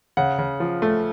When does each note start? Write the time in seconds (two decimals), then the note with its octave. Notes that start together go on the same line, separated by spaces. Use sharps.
0.17 C#3 F#5
0.39 C#3
0.60 F3
0.82 A3